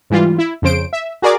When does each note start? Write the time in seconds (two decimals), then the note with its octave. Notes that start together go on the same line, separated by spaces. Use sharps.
0.10 G#2 E3 G3 F4
0.38 E4
0.62 F2 C#3 C5 D7
0.93 E5
1.22 F#4 G#4 A#4 D5 D6